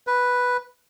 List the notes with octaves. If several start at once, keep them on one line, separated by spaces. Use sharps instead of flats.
B4